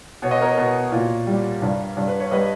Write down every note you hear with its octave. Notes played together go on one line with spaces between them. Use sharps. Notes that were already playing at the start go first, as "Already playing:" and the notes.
B2 C#5
D#5
A#4 C#5
B2
A#2
G3
G2
G2
B4
C#5
G3 B4 D#5